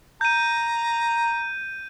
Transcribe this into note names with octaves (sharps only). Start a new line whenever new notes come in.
A#5 G6 D#7